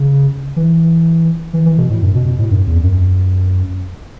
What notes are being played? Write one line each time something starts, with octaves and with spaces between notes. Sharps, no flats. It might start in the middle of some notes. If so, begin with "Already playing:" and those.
Already playing: C#3
E3
E3
E3
B2
A2
F#2
B2
B2
A2
F#2
E2
F#2